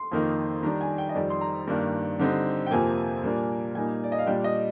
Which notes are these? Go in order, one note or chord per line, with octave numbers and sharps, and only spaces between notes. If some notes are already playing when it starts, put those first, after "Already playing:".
Already playing: C6
F2 D#3 A#3 D#4
D#3 G3 D4 A#5
G#5
G5
D#5
F2 D#3 G3 D5
C6
A#5
G2 D#3 A#3 D4
D3 G3 C4 D#4
G5
F2 C3 F3 A#3 G#5
A#2 G3 A#3 D4
A#2 G3 A#3 D#4 G#5
D5
D#5
F5
A#2 G3 D4 G5
D#5